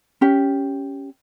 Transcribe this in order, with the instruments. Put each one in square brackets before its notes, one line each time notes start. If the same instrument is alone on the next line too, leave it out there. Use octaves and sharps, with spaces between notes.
[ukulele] C#4 G4